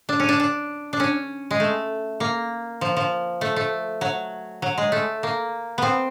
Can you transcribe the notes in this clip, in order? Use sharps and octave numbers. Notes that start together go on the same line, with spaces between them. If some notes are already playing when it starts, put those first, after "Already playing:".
D4
C#4
D4
D4
D4
C#4
G#3
A3
A#3
F3
F3
A3
A3
F#3
F#3
G#3
A3
A#3
B3 C4